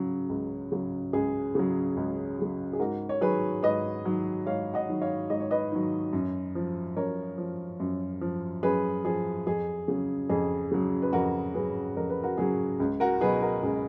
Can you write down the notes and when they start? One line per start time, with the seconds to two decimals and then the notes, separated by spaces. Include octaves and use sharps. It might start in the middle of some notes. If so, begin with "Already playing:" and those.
Already playing: C#3 F#3
0.29 C#2
0.72 C#3 F#3
1.13 C#2 G#4
1.55 C#3 F#3
1.97 C#2
2.38 C#3 F#3
2.73 G#4
2.79 G#2 F#4 A#4
3.09 C#5
3.21 D#3 F#3 G#4 B4
3.63 G#2 B4 D#5
4.05 D#3 F#3
4.46 G#2 C#5 F5
4.74 D#5 F#5
4.89 D#3 F#3
5.01 C#5 F5
5.30 G#2 D#5
5.40 C#5
5.51 B4 D#5
5.71 D#3 F#3
6.13 F#2
6.55 F3
6.96 F#2 A#4 C#5
7.38 F3
7.80 F#2
8.21 F3
8.63 F#2 G#4 B4
9.05 F3 G#4
9.47 F2 G#4
9.88 C#3 F#3
10.29 F2 G#4
10.71 C#3 F#3
11.02 B4
11.13 F2 F#4 A#4
11.54 C#3 F#3 G#4 B4
11.96 F2 A#4
12.09 B4
12.23 F#4 A#4
12.38 C#3 F#3 G#4
12.80 C#2
13.00 F#4 A#4
13.21 B2 F#3 G#4 B4
13.42 F#4 A#4
13.63 C#2 G#4